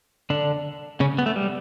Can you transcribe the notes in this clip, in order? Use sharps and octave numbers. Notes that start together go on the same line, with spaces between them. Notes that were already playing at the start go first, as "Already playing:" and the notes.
D3 D4
C#3 C#4
B3
A3
G3